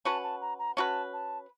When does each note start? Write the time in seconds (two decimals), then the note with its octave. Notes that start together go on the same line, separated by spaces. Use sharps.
0.05 C#4 F#4 B4 A5
0.23 A5
0.41 A#5
0.59 A#5
0.77 C#4 F#4 B4 A5
1.13 A5